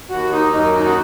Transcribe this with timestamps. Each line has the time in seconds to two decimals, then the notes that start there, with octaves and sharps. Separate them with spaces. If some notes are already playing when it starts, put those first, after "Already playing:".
0.10 D#2 F#4
0.32 D#4
0.53 F#2 D#4
0.74 D#4
0.85 F#4